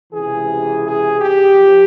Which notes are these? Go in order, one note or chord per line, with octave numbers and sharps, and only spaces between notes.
C#2 C3 E3 G#4
G#4
G4
F3